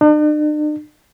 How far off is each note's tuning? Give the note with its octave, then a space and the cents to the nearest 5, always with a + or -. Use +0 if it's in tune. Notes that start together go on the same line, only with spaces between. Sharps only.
D4 +45